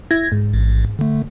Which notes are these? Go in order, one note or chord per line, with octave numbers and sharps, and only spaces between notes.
E4 G#6 A#6
G#2
A1
D3 A3